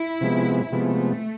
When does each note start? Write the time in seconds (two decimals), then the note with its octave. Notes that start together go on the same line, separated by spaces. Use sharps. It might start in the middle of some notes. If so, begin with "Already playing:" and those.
Already playing: E4
0.21 C3 F3 G#3 B3
0.72 C3 F3 G#3 A3 B3